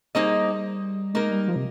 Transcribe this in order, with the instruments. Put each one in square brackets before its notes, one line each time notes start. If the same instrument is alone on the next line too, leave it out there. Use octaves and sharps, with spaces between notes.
[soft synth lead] G3 [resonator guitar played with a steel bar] A#3 D#4 G#4 C5 D#5
[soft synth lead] G#3 [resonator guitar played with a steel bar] A#3 D#4 A#4
[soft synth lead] G3
F3
C3